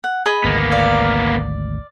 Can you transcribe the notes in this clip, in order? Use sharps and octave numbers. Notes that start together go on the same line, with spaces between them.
F#5
G#4 D#5 B5
G#1 D2 A#3 B3
D5 F5